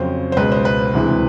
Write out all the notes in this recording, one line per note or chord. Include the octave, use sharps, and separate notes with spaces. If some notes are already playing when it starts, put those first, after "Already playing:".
Already playing: F2 C#3 F#3 C5
C5
C#2 B2 G#3 B4
C5
B4
D2 C3 E3 G#3